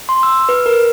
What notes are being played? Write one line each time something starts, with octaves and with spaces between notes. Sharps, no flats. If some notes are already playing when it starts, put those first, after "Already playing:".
C6
E6
B4
A#4